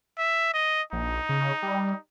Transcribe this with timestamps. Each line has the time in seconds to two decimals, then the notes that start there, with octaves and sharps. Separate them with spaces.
0.18 E5
0.54 D#5
0.93 A#1 D#4
1.29 C#3
1.63 G3